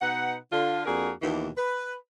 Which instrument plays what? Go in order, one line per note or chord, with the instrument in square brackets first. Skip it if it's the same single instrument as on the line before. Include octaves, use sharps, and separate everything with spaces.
[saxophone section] B2 D#4 B4 F#5
D3 F4
F2 A#3 D4 F#4 G#4 A#4
D#2 B2 E3
B4